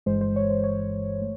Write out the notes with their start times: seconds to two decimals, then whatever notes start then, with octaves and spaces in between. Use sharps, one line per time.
0.06 G1 G2 E3 G#3 C5
0.21 C5
0.36 C#5
0.50 C5
0.64 C#5
1.21 A3